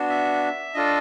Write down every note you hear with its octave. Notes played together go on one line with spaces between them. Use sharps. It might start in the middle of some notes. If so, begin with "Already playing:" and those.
Already playing: B3 D4 F#4
E5
D4 F4 A4 D#5